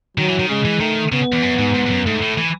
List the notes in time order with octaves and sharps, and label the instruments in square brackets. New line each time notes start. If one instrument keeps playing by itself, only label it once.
[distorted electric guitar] D#3 [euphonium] F#3
[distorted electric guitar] E3
D#3
[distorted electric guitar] C#3 [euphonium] G#3
[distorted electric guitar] E3
[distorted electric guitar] D#3 [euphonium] A3
[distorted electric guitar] C#3 [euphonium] B3
[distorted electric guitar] E2
F#2
G#2
G#2
G#2
F#2
[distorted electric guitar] G#2 [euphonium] A3
[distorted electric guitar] A2
E3